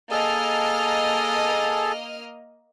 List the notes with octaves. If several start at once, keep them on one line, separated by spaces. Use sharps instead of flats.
A#3 G#4 A4 D#5 A5 F6